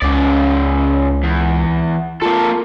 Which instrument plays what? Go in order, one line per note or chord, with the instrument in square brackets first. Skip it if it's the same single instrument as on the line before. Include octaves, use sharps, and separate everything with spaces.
[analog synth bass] C#2 [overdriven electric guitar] C#3 D5
[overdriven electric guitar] E2
[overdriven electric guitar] A#3 A4 [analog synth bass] F4